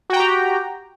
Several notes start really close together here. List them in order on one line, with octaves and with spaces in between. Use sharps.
F#4 G5 A#5 G4